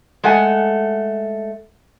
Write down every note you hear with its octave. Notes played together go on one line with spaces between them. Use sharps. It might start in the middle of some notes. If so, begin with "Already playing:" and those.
G#3 A3 F#5 G#5